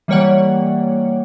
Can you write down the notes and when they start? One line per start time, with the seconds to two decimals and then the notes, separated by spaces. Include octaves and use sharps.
0.08 E3 G3 A#3 C#5 D5 F#5